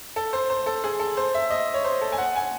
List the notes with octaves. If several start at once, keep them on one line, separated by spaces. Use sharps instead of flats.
A4
C5
C5
A4
G#4
A4
C5
E5
D#5
C#5
C5
A4
G#5
F#5
G#5